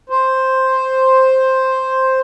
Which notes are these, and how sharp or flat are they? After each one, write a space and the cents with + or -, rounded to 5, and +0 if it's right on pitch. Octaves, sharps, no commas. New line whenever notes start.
C5 +5